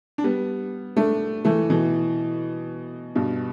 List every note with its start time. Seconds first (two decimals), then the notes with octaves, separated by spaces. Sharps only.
0.18 D4
0.24 G3 B3
0.97 A3 D4
1.45 E3 A3
1.70 B2 E3
3.15 G2 B2